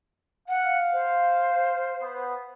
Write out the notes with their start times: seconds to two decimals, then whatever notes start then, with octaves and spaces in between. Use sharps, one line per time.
0.48 F5 F#5
0.93 C5
2.01 B3